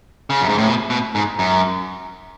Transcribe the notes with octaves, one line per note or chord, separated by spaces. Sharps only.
C#3
F#2
G#2
A2
B2
B2
G#2
F#2